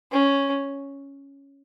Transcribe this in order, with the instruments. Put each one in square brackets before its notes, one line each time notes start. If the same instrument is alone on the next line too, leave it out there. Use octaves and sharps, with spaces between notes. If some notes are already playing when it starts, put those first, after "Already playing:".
[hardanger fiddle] C#4